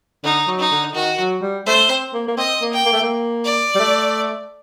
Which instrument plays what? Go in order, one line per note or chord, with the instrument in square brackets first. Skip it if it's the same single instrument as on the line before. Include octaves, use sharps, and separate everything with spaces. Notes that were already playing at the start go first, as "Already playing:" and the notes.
[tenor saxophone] D3 [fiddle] D#4
[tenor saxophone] F#3
[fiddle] D#4
[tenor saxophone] D3
[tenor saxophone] D#3 [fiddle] F#4
[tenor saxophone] F#3
G3
[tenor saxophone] A3 [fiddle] C5
[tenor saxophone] C4
A#3
A#3
[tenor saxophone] C4 [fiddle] D#5
[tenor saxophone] A#3
[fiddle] G5
[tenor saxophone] A#3
A3
A#3
[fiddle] D5
[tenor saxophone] G3
A3